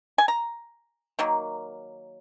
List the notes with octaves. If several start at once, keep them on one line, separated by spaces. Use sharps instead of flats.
G#5
A#5
D#3 F#3 A#3